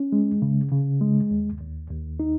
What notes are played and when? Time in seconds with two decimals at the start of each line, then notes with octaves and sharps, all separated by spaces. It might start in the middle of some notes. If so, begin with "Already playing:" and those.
Already playing: C#4
0.12 G#3
0.42 C#3
0.72 C#3
1.01 G#3
1.31 D#2
1.61 D#2
1.90 D#2
2.20 D#4